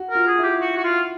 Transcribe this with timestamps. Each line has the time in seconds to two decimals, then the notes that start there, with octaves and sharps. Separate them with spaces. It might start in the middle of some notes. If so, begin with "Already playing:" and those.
Already playing: F#4
0.10 F4 A#4
0.27 G#4
0.38 E4
0.43 G4
0.61 F#4
0.77 F#4
0.84 F4